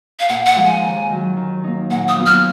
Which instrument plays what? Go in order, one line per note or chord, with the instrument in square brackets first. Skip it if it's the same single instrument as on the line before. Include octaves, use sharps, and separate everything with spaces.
[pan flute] F5
[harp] A#2 [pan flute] F#5
[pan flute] F#5
[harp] F3 G#3 D#4
[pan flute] G#5
[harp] D#2
D#3 F#3
D#3
A#3 D#4
[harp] A#2 [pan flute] F#5
[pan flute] D#6
[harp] F#3 B3 F4
[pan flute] F6